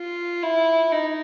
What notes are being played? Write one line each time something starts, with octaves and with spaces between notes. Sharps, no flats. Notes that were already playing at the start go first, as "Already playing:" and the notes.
Already playing: F4
E4
D#4